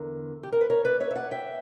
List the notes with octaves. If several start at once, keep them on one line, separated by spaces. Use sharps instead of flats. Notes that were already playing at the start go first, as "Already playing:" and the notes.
Already playing: E2 D3 A#4
G4
A#4
B4
A#4 C#5
B4 D5
C#5 E5
E5
D5 F#5
E5 G5